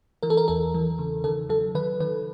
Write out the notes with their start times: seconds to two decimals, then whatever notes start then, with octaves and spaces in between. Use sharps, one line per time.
0.23 E3 A#4
0.30 A4
0.37 A#4
0.48 E2 A4
0.74 E3
0.99 C#3
1.24 D#3 A4
1.49 F#3 A4
1.75 D#3 B4
2.00 D#3 B4